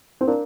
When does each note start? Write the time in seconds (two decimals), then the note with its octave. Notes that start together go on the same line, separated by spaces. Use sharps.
0.21 C4
0.27 D4 D#4 A#4 F5 A#5